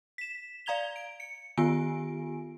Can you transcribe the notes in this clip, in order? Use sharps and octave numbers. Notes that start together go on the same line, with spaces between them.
B6 E7
D5 F5 A#5 G#6 F7 G7
D7
C#7
D#3 B3 F4 G4 G#5 D7